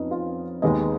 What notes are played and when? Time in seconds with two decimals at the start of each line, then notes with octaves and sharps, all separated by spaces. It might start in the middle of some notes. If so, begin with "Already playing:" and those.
Already playing: F2 F3 B3 C#4 D#4
0.11 F4
0.62 D#2 D#3 G#3 B3 D#5